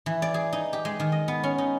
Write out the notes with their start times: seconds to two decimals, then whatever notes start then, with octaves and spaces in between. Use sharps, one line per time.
0.06 E3
0.22 D5
0.34 G#4
0.53 D#4
0.73 G4
0.85 G#3
1.00 D#3
1.12 D#5
1.28 B3
1.43 C#4
1.58 D#4